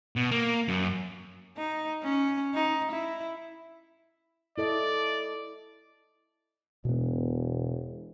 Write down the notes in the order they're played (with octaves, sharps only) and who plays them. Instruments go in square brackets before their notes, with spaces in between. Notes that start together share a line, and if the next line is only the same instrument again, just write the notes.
[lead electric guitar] B2
A#3
F#2
[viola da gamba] D#4
C#4
D#4
E4
[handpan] E4 A4 D#5 [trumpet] D5
[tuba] E1 [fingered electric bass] B2 B3